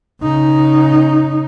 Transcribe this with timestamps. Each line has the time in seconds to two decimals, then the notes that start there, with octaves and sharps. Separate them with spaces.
0.22 C#3 D#4